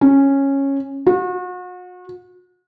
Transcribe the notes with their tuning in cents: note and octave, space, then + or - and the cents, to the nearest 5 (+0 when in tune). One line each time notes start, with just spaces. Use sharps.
C#4 -10
F#4 -40